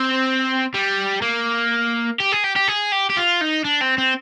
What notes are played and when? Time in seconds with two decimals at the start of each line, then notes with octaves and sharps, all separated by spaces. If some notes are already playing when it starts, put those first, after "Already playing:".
Already playing: C4
0.74 G3
1.22 A#3
2.20 G4
2.32 G#4
2.44 G4
2.56 G4
2.68 G#4
2.92 G4
3.10 G4
3.17 F4
3.41 D#4
3.65 D4
3.81 C4
3.98 C4